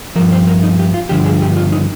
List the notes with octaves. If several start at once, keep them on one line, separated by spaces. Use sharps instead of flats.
G2 F3 A#4
C5
A#4
D#4
G4
F4
G2 D3 F3 G4
G#4
G4
F4
D#4